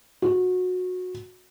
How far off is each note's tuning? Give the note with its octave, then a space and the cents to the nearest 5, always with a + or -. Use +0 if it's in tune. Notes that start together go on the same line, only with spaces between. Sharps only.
F#4 -20